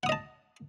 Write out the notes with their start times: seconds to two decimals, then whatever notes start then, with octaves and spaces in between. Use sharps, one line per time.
0.03 F#5
0.06 D#6
0.09 D#5
0.12 A5